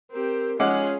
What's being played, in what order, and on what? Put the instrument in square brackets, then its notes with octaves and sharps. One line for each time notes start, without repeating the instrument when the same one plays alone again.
[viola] C4 G4 [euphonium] A#4
[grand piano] G#3 F#5 D6 [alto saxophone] C#4 [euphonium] D#4 [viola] F4 G#4